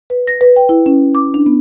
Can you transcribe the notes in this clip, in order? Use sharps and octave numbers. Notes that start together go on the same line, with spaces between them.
B4
A#6
B4
G5
E4
C#4
D6
D4
B3